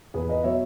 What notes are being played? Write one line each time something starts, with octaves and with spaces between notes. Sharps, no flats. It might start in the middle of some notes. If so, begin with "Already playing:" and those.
E2 G#4 B4
B4 D#5
B2 F#3 C#5 E5